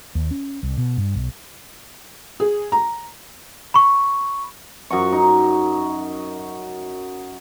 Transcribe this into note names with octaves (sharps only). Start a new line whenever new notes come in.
D#2
C#4
C2
B2
G2
B1
G#4
A#5
B5 C#6
F#2 F#4 C#6
D#4